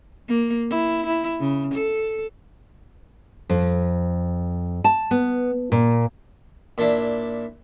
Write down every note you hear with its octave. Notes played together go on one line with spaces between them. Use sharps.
A#3
E4
E4
C#3
A4
F2
A5
B3
A#2
A#2 D4 E4